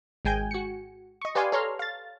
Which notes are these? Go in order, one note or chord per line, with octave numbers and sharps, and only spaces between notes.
G#1 G#3 G5 G#5 G6
F#4 C#7
D#5 C#6
G4 B4 D5 F5 G#5 C6
A4 C#5 A#5 C6 F6
F5 A6